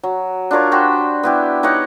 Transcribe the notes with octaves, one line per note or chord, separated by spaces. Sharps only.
F#3
D4 F4 A#4 C#5
F#4 G4 C5 B5
B3 E4 G4
D#4 G4 C#5 F#5